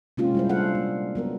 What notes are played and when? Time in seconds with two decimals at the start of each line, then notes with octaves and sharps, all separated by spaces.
0.17 C3 G#3 A#3 C#4 F4 G4
0.35 G3 E4 C5
0.49 G3 A3 D4 A4 F5 F#5
0.75 A#3
1.15 F#3 B3 A#4